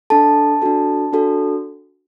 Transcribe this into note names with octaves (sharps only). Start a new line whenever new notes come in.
D4 A4 A5
D4 F#4 A4
D4 F#4 A4